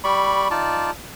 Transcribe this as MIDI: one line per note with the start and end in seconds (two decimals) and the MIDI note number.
0.04 0.48 55
0.04 0.48 74
0.04 0.48 83
0.04 0.48 85
0.51 0.91 63
0.51 0.91 65
0.51 0.91 74
0.51 0.91 81